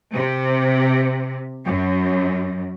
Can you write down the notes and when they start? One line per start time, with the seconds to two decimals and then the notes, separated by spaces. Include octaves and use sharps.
0.13 C3
1.65 F#2